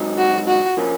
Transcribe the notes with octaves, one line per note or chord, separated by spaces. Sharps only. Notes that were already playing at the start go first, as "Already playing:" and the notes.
Already playing: G#2 F#3 C4 D#4
F#4
F#4
A#2 F3 A#3 C#4